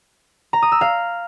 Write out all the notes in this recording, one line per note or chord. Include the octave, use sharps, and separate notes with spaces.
A#5
D#6
E6
F5